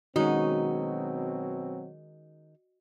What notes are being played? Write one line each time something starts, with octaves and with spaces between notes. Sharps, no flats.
B2 D#3 F#3 G#3 C4 C#4 D#4 F#4